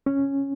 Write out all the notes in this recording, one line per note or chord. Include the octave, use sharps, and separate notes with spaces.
C#4